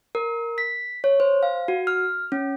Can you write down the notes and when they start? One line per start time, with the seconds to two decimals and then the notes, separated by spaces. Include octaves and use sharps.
0.15 A#4
0.58 B6
1.04 C#5
1.20 C5
1.43 F5
1.68 F#4
1.87 F6
2.32 C#4